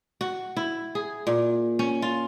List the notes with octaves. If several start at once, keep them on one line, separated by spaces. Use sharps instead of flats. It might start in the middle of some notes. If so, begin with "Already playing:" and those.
F#4
E4
G#4
A#2
C#4
F4